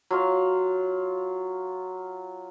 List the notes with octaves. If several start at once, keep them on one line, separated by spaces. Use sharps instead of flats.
F#3 F4 F5